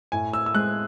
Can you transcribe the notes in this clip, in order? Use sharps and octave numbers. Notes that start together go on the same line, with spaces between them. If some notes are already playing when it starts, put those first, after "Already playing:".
A2 G#5
E6
E6
G#3 F#6